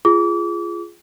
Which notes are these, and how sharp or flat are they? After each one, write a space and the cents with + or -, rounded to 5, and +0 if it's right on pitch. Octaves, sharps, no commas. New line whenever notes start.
F4 -25 G#4 +0 D6 -35